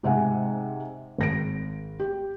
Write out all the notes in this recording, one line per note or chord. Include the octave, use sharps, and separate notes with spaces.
G#2 C3 E5 F#5 G#5
G#1 A#6 D7
G4